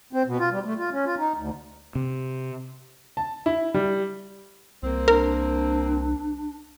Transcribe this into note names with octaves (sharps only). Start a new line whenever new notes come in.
C4
B2
F4
G3
A3
F4
C#4
F4
D#4
D2
C3
A5
E4
G3
C2 A#3 C4
D4 A#4